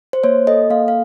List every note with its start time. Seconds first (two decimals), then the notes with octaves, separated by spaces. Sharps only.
0.13 C5
0.24 A#3 C#5
0.47 A4 D#5
0.70 A#3 F5
0.88 F5